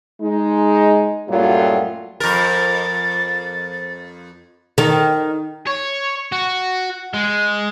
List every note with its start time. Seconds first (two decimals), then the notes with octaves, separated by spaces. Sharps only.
0.20 G#3 D#4
1.28 F#2 A2 F#3 G3 A#3 F4
2.20 F2 A#4 A6
4.78 D#3 A4
5.67 C#5
6.32 F#4
7.14 G#3